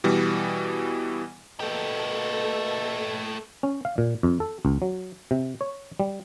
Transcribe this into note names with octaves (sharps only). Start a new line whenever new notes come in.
B2 E3 G3
B2 A3 A#3 G4 A4
C#4
F5
A#2
F2
A4
C#2
F#3
C3
C#5
G3